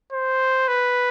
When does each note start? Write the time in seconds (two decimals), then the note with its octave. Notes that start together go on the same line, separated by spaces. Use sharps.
0.12 C5
0.68 B4